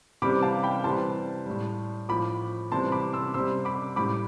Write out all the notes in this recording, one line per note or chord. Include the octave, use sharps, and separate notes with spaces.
C3 E3 G3 B5 D6
F5 A5
G5 B5
C3 E3 G3 A5 C6
A2 G3
A2 F3 B5 D6
C3 E3 G3 A5 C6
B5 D6
C6 E6
C3 G3 C6 E6
B5 D6
A2 G3 B5 D6